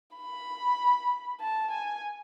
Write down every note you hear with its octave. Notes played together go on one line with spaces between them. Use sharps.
B5
A5
G#5